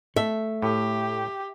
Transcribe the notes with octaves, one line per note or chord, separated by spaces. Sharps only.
A3 E5
A2 G4